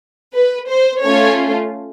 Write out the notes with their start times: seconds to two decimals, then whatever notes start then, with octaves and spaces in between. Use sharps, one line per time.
0.35 B4
0.70 C5
1.04 A3 C#4 F4 C#5